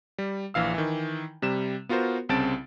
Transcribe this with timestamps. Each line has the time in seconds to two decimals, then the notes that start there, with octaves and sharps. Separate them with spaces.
0.18 G3
0.54 A#1 E3 F5 E6
0.74 D#3 E3
1.42 C3 G3 E7
1.89 B3 F4 F#4 A#4 C5
2.29 C2 C#3 C4 A5 A6 D7